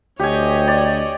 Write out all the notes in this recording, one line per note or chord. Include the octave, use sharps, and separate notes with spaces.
D2 G4 C#5 D#5 G#5
D5